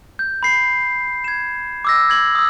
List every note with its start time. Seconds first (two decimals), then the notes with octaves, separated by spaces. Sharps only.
0.19 G6
0.43 B5 C7
1.24 G#6 E7
1.85 D6 E6 A#6
2.10 G#6 F#7
2.35 D#6 E6